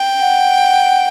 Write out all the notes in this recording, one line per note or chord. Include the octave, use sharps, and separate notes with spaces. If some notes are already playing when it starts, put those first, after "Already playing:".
Already playing: G5
F#5